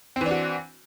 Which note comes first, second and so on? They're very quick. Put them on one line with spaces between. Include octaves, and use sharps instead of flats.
C4 E3 D4 F#4